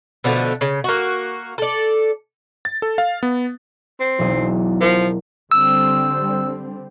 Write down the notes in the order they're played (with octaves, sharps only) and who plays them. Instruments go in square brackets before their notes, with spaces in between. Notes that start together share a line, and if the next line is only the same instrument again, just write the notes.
[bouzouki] B2 D3 F3 A3
C#3
A#3 F#4
A4 D5
[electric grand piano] A6
A4
F5
B3
[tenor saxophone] C4
[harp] E1 B1 G#4
[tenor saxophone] F3 [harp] A#4
[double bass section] D3 G3 C4 [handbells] E6